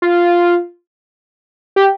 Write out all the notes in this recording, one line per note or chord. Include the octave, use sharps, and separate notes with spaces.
F4
G4